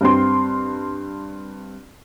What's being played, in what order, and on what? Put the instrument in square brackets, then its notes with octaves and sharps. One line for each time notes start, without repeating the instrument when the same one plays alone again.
[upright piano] G2 C4 C6